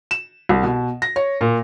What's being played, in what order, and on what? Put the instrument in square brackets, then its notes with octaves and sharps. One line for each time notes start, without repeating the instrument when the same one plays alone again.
[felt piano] E7
C2
B2
A#6
C#5
A#2